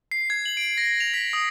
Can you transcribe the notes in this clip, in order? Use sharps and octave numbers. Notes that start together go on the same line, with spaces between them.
C7
G#6
F#7
D7
A#6
F7
B6
D#6